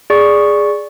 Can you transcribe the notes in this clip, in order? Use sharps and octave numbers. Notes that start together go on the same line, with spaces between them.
G#4 D5 C#6